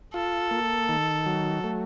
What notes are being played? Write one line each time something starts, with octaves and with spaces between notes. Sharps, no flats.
F4 A4
A#3
D#3
F#3
A3